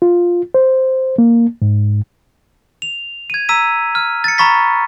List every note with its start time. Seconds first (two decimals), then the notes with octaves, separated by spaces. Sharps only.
0.02 F4
0.54 C5
1.18 A#3
1.62 G#2
2.82 F7
3.30 G#6 D#7
3.49 A#5 E6 B6 D#7
3.95 F6
4.24 A6 C#7
4.38 A#5 B5 C#6 A6 B6